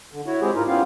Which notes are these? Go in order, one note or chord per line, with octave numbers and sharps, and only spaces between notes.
D3
E4 F#4 C#5
G#3 C4 E4 G4 G#4
G#2 D#4 F4 A#4
B3 C#4 E4 F4 G4 F5